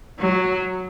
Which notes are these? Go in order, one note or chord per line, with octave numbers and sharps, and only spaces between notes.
F#3